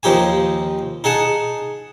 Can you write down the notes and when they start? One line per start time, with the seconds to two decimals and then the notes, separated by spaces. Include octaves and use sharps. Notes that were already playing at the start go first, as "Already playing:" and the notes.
0.03 D#2 F3 D#4 G4 G#5
1.04 D#4 G#4 F#5 A5